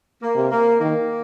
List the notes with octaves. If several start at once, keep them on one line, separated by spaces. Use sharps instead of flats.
A#3
C3
A#3
D#3 A#3